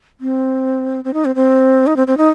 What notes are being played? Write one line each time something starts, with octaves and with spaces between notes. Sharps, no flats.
C4
C4
D#4
C4
C4
D#4
C4
C4
D#4